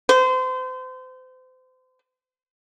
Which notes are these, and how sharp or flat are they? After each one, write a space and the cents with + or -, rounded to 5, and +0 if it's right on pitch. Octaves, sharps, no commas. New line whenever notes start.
C5 -35